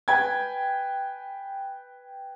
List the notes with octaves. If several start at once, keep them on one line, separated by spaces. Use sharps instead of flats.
B4 G5 G#5 G#6